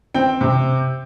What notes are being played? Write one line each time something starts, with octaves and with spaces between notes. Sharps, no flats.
C4 G5
C3